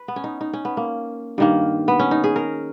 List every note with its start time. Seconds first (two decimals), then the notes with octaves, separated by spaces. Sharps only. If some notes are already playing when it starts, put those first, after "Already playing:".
Already playing: B4
0.08 B3
0.16 C#4
0.24 D#4
0.41 D#4
0.53 C#4
0.65 B3
0.77 A#3
1.38 G2 D#3 A#3
1.88 B3
1.99 C#4
2.11 D#4
2.24 G#4
2.36 A#4